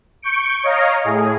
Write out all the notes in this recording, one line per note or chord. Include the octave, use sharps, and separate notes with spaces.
C#6 G6 C#7 D7
C#5 D#5 F5 A#5
A2 G#4